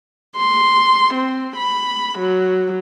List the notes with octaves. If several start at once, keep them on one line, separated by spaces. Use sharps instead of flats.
C6
C4
B5
F#3